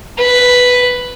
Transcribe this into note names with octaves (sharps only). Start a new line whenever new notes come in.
B4